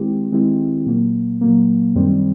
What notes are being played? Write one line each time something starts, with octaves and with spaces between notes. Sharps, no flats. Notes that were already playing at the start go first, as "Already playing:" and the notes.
Already playing: D#3 G#3 C4 E4 G4
D#3 G#3 C4 E4 G4
A#2 F#3 A#3
A#2 F#3 A#3
F#2 D#3 G3 C4